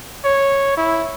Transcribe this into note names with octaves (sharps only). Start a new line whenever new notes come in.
C#5
E4